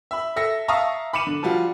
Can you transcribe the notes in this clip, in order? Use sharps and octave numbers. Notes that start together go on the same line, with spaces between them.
E5 B5
A4 E5 A#6 C#7
E5 F5 A5 A#5 C#6 D#6
B5 D6 C#7 D#7 E7 F#7
D3
F3 G3 F4 F#4